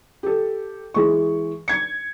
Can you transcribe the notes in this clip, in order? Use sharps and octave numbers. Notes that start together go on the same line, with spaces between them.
G4 A4
E3 G#3 C#6
G#6 C#7